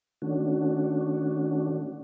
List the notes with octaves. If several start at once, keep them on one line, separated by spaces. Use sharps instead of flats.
D#3 A3 C#4 D4 F#4